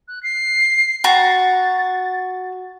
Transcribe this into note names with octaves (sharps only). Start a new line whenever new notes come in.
F#6
C7
F#4 A#5 A6